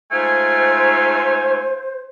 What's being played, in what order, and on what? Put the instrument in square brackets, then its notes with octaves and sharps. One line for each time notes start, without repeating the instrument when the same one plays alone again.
[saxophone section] G#2 A3 F4 [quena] C5 [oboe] G#5